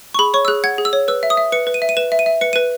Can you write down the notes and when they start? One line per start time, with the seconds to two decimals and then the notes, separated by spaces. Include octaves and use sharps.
0.14 C#6
0.19 G#4 B5
0.34 C#5 C#6
0.45 E6
0.48 G#4 F#6
0.64 F#5 G#6
0.78 G#4
0.85 E6
0.93 C#5
1.08 B4 E6
1.23 E5
1.30 D#6
1.37 E5
1.52 B4 C#7
1.67 B4
1.74 D#7
1.82 E5
1.89 D#7
1.97 B4 E7
2.12 E5
2.19 D#7
2.26 E5
2.41 B4 C#7
2.53 B4 D#7